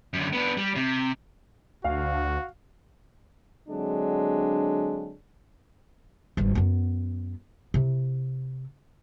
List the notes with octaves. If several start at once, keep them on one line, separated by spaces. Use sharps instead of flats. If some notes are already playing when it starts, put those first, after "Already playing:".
F#2 D3
B3 D4
G3
C3
D2 F#4 F5
D3 F#3 G#3 C4 D4
G#1 G2
F#2 B3
C3 E4